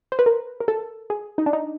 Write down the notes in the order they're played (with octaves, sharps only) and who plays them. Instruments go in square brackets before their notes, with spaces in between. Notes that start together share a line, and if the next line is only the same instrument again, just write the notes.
[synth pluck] C5
B4
A#4
A#4
A4
G#4
D#4
D4
D#4